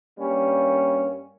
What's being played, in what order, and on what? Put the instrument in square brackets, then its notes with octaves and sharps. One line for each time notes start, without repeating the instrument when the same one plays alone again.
[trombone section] G2 G3 A#3 C#4